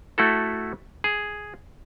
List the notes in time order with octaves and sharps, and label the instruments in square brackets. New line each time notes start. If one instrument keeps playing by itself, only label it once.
[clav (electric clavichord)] A3 E4 F#4 A4
G#4